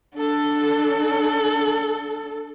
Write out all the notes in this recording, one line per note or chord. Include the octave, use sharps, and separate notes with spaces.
D4 A4